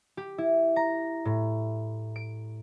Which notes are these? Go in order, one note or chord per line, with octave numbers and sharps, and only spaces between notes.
G4
E4
A#5
A2
D7